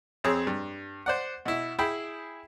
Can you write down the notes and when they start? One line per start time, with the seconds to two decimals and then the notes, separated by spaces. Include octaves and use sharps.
0.24 F2 C4 G#4 C#5
0.47 G2
1.06 C5 D5 F#5
1.46 B2 E4
1.79 E4 G#4 G5 B5